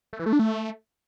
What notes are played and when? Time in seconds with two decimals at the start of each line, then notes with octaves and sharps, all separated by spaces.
0.13 A3
0.19 E3
0.26 A3
0.33 D4
0.39 A3